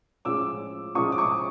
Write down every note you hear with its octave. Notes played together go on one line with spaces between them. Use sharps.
A2 F3 G#3 C#4 F4 D6 E6
A2 F3 G#3 C#4 F4 C#6 D#6
D6
C#6 D#6